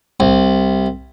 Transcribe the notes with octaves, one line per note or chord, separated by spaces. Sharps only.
C2